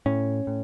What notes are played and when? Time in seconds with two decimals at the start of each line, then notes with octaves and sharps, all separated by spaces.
0.06 A2 C#4
0.47 A2